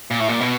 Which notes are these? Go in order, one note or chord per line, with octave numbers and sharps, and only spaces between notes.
A#2
A2
A#2
B2